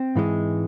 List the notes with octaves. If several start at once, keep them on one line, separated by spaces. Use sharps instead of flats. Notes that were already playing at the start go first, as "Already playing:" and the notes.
Already playing: C4
G#2 E3 G#3